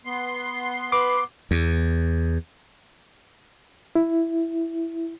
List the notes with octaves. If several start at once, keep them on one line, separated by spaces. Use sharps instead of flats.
B3 C6
B4 D6
E2
E4